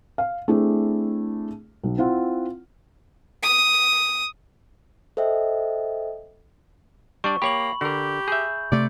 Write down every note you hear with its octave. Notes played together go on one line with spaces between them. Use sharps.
F5
A3 C4 D4 E4 G#4
B1
C4 E4 F4 F#5
D#6
A4 C5 D#5 E5 G5
G3 D4 D5 C#6
A#3 G4 C#5 B5 F#7
D3 G4 A#4
G#4 E5 G6
C3 A3 D5